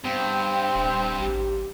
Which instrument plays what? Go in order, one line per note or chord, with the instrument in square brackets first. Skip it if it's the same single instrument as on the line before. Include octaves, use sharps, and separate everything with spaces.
[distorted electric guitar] G2 [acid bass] B3 [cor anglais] C4 [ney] G5
[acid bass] D#1
[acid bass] A1 [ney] G4